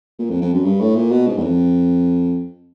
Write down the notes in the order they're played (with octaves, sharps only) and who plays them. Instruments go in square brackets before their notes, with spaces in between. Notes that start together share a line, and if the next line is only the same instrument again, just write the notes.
[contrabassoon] A#2
F2
F2
F#2
G2
A2
A#2
B2
G#2
E2
F2